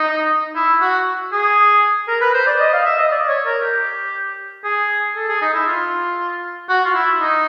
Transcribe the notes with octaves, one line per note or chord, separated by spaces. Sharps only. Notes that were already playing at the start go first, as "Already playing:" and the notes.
Already playing: D#4
E4
F#4
G#4
A#4
B4
C5
D5
D#5
F5
E5
D#5
D5
C#5
A#4
G4
G#4
A4
G#4
D#4
E4
F4
F#4
F4
E4
D#4